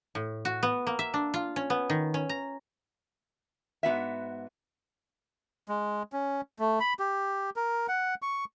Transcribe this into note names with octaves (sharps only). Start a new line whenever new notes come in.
A2
F#4
B3
A#3
E5
D4
F4
C#4
B3
D#3
C#4
A#5
G#2 B3 F#4 E5
G#3
C#4
A3
B5
G4
A#4
F#5
C#6